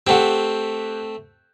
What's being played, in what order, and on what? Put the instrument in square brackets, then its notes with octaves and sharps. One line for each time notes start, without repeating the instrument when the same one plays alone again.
[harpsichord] A3 C4 [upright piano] G4 F#5